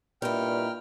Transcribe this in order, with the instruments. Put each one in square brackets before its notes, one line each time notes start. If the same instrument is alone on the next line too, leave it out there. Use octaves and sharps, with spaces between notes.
[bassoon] G2 [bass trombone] A#2 [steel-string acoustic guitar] D#4 E4 [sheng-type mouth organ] G5 F6